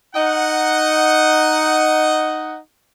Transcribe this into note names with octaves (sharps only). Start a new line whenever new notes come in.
D#4 D#5 F#5